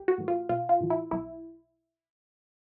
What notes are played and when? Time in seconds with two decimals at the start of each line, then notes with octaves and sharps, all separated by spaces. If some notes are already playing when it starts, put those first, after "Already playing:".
Already playing: B1 G4
0.08 F#4
0.18 A2 E3
0.28 F4
0.49 B1 F4
0.69 F4
0.81 A2 E3
0.90 E4
1.11 B1 E4